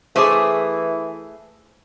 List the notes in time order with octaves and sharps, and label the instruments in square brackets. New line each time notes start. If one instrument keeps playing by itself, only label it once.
[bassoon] E3 [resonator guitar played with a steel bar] A3 G#4 [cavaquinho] C5 E5 D6